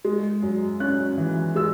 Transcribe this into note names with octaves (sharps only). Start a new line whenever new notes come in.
G#3
F#2
C#4 F#6
E3
G#3 E6